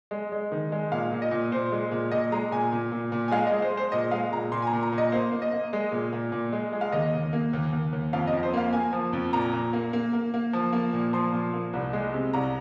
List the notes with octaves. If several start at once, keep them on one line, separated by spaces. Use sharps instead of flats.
G#3
G#3
D#3
G#3
A#2 F5
A#2
D#5
A#2
A#2 C5
G#3
A#2
A#2 D#5
G#3 A#5
A#2 G#5
A#2
A#2
A#2
G#5
G#3 F5
D#5
G#3
C5
G#3
C5
A#2 D#5
G#3 F5
A#2 A#5
A#2 C6
G#5
A#5
A#2
A#5
A#2
D#5
A#3 C5
A#3
D#5
A#3
G#3
A#2
A#2
A#2
G#3
G#3
F5
D#2 D#5
D#2
A#3
D#2
D#2
D#2
F2 F5
D#5
F2
C5
A#3 F5
A#3 G#5
F3
F2
A#2 A#5
A#2
A#3
A#3
A#3
A#3
F3
A#3
A#2
F3 C6
A#2
A#3
C2
G#3
C3
C2 A#5